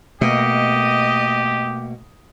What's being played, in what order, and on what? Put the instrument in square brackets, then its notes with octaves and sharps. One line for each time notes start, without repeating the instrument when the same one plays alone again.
[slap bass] B2 [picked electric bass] A3 A#3 [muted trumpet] G4 [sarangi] D#5